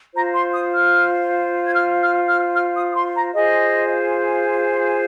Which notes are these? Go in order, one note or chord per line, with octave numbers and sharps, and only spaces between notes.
F4 C5 A#5
C6
D#6
F6
G#6
F6
F6
F6
F6
D#6
D#6
C6
A#5
F4 G#4 C5 D#5